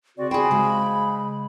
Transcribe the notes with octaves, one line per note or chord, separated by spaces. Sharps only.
C#3 C4 F#4 D5
G#4 C5 G5 B5
C#3 G#3